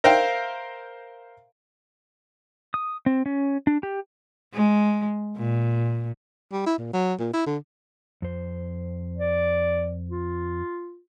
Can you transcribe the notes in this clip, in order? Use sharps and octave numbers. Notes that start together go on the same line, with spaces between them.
A#4 C5 E5 F5 G5
D#6
C4
C#4
D4
G4
G#3
A#2
G3
E4
A#2
F#3
A#2
E4
D3
F2 C5
D5
F4